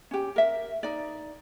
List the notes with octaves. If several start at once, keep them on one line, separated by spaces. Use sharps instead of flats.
C#4 G4
A#4 E5
D#4 D5